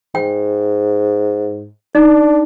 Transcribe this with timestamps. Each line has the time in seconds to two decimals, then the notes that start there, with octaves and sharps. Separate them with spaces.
0.15 G#2 G5
1.95 D4 D#4